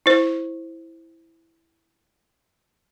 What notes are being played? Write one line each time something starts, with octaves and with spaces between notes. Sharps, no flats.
E4 C5